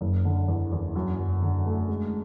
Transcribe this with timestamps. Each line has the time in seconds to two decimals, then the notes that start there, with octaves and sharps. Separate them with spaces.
0.01 F#1
0.25 D3
0.48 E2
0.72 E2
0.96 F#2
1.19 F#1
1.42 D3
1.66 A3
1.89 G#3